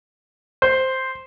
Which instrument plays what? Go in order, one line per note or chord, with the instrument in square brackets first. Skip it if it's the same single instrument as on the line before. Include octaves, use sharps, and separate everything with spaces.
[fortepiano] C5